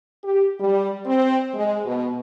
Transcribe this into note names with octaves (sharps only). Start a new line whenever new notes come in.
G4
G3
C4
G#3
B2